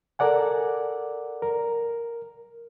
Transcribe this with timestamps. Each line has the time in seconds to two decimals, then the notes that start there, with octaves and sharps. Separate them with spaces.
0.19 A4 A#4 D5 F#5 G#5
1.42 A#4